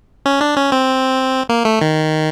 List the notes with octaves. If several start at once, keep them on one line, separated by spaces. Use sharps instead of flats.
C#4
D4
C#4
C4
A#3
A3
D#3